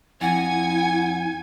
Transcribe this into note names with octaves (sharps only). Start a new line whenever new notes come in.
F2 E4 F#5 G#5 G#6